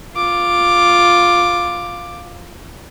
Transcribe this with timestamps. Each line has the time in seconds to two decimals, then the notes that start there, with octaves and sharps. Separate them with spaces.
0.15 F4 D6